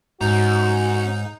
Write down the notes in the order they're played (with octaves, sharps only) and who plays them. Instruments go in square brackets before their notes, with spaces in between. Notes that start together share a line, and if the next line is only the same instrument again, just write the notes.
[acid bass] G#2 [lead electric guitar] C#4 A#5 [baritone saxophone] D#4 [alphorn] F#4